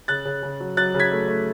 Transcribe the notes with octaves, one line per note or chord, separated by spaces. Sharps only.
C#3 F#6 A6
C#3
C#3
F#3
F#3 F#6 A6
C#3
G#6 B6
A3
A3